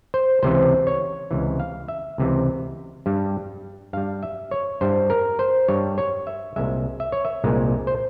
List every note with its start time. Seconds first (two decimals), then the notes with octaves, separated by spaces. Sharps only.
0.14 C5
0.43 C#2 C3 E3 C5
0.87 C#5
1.31 C#2 C3 E3
1.60 F5
1.88 E5
2.18 C#2 C3 E3
3.06 G2 G3
3.93 G2 G3 F5
4.23 E5
4.51 C#5
4.81 G2 G3 C5
5.10 A#4
5.39 C5
5.68 G2 G3 C#5
5.98 C#5
6.27 E5
6.56 C2 A#2 G#3 E5
7.00 E5
7.12 C#5
7.25 E5
7.44 C2 A#2 G#3
7.87 C5